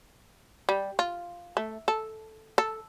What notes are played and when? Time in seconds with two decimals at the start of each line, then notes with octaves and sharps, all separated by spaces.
0.69 G3
0.99 F4
1.57 A3
1.88 A4
2.58 A4